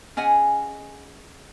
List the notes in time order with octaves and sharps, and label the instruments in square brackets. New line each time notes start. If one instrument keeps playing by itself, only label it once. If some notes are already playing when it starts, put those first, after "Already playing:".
[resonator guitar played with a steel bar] C#4 G#4 D#5 F#5 G#5